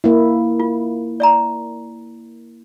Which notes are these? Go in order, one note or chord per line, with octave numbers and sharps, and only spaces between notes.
A#3 E4
F4
D5 E5 A#5